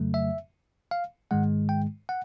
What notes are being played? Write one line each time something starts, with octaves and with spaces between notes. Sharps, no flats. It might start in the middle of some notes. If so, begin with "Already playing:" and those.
Already playing: F2 C#3 F#3 A3
E5
F5
G#2 D#3 G#3 F#5
G5
F#5